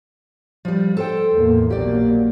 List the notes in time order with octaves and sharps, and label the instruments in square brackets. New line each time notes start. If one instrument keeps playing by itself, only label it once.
[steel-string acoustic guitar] F3 G3
A4 C5 G5
[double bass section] E2 A2 A#3
[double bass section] A#1 F#3 A#3 [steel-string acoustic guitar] G4 D5